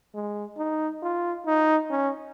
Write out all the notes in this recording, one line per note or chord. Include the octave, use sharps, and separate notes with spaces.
G#3
D#4
F4
D#4
C#4